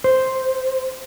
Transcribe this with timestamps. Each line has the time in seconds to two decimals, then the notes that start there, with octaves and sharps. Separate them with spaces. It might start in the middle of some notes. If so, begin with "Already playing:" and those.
0.04 C5